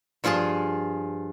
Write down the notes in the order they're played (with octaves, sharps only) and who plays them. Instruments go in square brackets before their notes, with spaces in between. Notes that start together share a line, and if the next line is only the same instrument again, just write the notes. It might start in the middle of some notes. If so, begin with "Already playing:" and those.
[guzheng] G2 F3 F4 G#4 A5